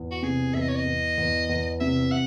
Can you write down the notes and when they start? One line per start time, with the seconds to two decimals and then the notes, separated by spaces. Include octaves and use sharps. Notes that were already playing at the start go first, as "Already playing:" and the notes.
Already playing: E2
0.11 F#4
0.22 C3 G#4
0.54 E2 E5
0.61 D#5
0.68 C#5
0.76 D#5
0.86 E2
1.18 E2
1.49 E2
1.80 C3 E5
2.11 F#5